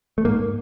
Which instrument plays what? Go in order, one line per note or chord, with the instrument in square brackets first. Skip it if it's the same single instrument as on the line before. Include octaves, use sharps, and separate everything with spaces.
[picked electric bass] A3
G#2 A#3